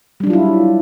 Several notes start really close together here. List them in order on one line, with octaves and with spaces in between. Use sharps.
G3 D4 F#3 F4 E4